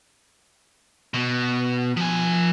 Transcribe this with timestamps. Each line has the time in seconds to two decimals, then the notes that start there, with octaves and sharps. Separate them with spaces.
1.14 B2
1.97 F3 G#5